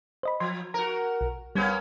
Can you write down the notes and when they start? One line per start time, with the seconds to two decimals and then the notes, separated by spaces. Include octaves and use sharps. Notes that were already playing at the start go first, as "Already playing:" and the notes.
0.23 C5 D#5 B5
0.40 F3 C6
0.74 F#4 A#4 A#5
1.21 B1
1.55 G3 A#3 B3 C#4 G#6